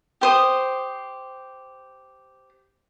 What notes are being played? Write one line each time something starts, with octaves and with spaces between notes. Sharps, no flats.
G4 C5 D#6